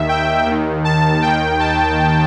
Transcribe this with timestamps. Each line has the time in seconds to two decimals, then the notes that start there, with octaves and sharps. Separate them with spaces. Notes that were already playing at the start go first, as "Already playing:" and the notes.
Already playing: D#2 D#3 E5
0.09 G5
0.46 D#2 D#3
0.84 A5
1.22 D#2 D#3 G5
1.60 A5